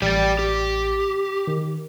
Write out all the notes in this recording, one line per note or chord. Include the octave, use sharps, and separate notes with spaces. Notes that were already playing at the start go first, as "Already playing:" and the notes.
A1 G4 D5 A6
G4
D#3